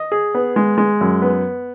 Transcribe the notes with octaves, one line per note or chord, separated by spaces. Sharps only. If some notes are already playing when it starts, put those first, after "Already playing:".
Already playing: D#5
G#4
B3
G#3
G#3
F#2
B3